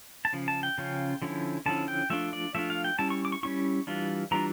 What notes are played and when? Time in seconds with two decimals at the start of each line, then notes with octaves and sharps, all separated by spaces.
0.25 A5
0.33 C#3 F3
0.48 A5
0.63 G5
0.78 C#3 F3 C#4 F4
1.22 D3 F3 C#4 E4
1.66 D3 F3 C#4 E4 A5
1.88 G5
2.10 F3 A3 D4 F4 E5
2.33 D5
2.54 F3 A3 D4 F4 E5
2.70 F5
2.84 G5
2.99 G3 C#4 E4 A5
3.10 C#6
3.25 D6
3.32 C#6
3.43 G3 C#4 E4 C#6
3.87 E3 G3 D4 F4
4.31 E3 G3 D4 F4 A#5